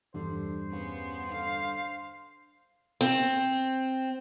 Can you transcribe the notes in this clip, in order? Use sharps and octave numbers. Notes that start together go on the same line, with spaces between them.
E2 G2 D3 G3 C5
C#3 B3
D3 F5
C4